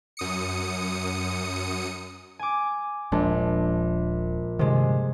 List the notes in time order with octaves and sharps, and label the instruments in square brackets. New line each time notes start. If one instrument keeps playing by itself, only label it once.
[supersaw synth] F#2 D#6 C#7
[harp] G#5 D6
[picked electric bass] D#1 G#3 D4 [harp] A#1
[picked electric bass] G2 D#3 [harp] C3 G#3